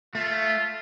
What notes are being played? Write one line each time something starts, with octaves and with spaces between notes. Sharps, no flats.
A3 F4